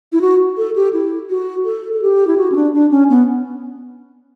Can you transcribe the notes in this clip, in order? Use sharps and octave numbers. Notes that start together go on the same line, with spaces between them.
E4
F#4
A4
G4
E4
F#4
A4
A4
G4
E4
F#4
C#4
D4
D4
C#4
B3